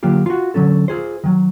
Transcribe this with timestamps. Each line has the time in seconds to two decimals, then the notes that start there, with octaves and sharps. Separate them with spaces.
0.03 D3 F#3 A#3 F4 G4
0.26 F4 F#4
0.54 D3 F#3 C#4 A4
0.88 F4 G#4 C5
1.24 D#3 F#3